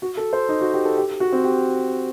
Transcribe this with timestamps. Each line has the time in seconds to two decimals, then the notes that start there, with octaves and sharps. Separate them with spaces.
0.02 F#4
0.17 A4
0.33 C5
0.49 D#4
0.61 F#4
0.73 G4
0.85 A4
0.97 G4
1.20 F#4
1.32 C4
1.44 G4